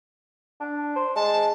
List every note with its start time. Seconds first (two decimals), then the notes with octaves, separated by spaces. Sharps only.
0.61 D4
0.96 C5
1.16 G#3 A5